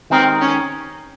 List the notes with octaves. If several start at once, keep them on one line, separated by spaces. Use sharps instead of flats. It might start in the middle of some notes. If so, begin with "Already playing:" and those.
D#3 G#3 C4 D#4 G4 A#4
C#4